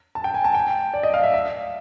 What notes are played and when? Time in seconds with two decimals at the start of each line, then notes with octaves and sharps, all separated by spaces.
0.15 A5
0.24 G5
0.34 G#5
0.44 A5
0.55 G5
0.94 D5
1.03 D#5
1.14 F5
1.23 E5
1.34 E5